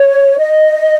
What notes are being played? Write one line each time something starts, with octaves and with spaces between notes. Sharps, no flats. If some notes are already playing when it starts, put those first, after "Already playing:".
Already playing: C#5
D#5